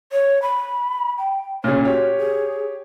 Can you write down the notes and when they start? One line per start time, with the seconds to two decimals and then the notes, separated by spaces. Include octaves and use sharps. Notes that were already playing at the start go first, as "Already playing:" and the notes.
0.12 C#5
0.42 B5
1.18 G5
1.64 A#2 C#3 C#5
1.85 F#4 G4 C#5
2.18 G#4